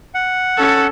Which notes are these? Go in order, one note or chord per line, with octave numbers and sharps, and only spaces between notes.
F#5
C#4 A4